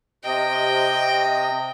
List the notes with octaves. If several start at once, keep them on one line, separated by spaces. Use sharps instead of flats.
C3 D#5 G5